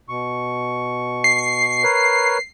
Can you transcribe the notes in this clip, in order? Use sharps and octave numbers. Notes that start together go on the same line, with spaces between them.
B2 C#6
C7
A#4 B4 C#5